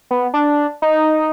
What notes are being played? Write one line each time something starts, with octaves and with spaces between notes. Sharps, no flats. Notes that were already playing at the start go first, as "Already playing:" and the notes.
B3
D4
D#4